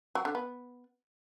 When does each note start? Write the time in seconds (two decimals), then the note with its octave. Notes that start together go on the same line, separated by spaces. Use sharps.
0.15 F#3
0.25 D3
0.35 B3